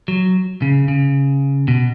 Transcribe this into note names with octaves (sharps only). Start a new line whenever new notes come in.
F#3
C#3
C#3
B2